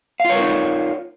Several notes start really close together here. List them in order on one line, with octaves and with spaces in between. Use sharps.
F5 F4 C#5 A#4 D#4